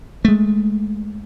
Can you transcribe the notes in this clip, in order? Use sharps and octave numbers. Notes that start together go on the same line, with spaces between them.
G#3 A3